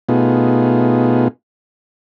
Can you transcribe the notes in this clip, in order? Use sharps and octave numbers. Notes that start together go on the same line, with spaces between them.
B2 A3 B3 D#4 F4 G#4